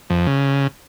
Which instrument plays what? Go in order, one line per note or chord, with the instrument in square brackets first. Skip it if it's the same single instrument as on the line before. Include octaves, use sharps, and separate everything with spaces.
[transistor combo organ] F2
C#3